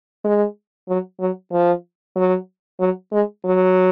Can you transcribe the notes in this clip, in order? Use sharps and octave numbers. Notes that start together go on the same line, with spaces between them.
G#3
F#3
F#3
F3
F#3
F#3
G#3
F#3